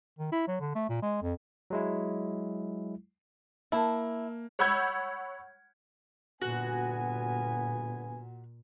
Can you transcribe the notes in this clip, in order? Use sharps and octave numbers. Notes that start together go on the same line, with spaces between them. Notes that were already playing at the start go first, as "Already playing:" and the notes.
D#3
E4
F#3
D3
A3
A#2
G#3
F2
F#3 G#3 E4
A#3 E4 A5
C#5 F#5 B5 E6 G6 G#6
G1 A#2 B3 F#4 G#5